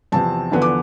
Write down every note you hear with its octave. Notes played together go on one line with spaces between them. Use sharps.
E2 C3 F3 C4 A5
E2 D3 F3 B3
D6